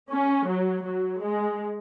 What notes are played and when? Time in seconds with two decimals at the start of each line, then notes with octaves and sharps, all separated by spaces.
0.12 C#4
0.49 F#3
0.85 F#3
1.22 G#3